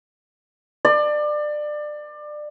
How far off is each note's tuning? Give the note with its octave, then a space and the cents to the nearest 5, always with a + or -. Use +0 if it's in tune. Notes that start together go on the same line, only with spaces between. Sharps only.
D5 +25